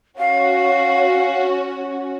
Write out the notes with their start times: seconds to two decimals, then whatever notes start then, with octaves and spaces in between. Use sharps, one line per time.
0.19 C#4 F#4 F5